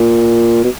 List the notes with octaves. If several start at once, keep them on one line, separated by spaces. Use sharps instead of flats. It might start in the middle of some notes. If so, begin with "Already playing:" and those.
Already playing: A#2
B2